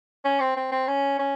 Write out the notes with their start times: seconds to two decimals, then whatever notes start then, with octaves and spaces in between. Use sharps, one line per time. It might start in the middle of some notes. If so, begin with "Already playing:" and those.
0.25 C#4
0.40 C4
0.57 C4
0.72 C4
0.88 C#4
1.19 C#4